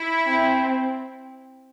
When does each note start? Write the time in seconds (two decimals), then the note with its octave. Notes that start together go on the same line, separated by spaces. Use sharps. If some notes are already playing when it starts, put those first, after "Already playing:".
Already playing: E4
0.26 C4